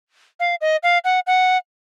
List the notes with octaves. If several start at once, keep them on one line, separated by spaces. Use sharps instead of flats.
F5
D#5
F5
F#5
F#5